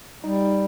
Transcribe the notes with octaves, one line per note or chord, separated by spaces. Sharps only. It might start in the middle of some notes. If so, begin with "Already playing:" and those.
G3 D#4